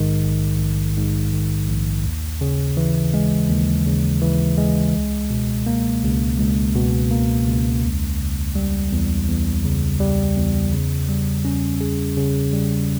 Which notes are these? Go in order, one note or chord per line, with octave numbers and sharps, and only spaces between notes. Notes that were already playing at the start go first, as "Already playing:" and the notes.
Already playing: A#1 G#2 D#3
A#1
A#1
G#2
D#3
A#1
D#2
C#3
E3
G#3
D#2
C#3
E3
G#3
C#2
B2
A#3
C#2
C#2
B2
A#3
C#2
E2
C#3
G3
E2
E2
C#3
G3
E2
C#3
G3
C#4
G#4
C#3
G3